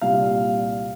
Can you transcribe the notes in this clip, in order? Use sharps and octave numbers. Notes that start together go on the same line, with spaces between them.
C2 A#2 G3 F5